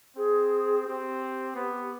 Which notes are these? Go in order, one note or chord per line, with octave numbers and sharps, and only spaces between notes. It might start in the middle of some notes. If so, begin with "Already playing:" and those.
C4 G#4
C4 G4
B3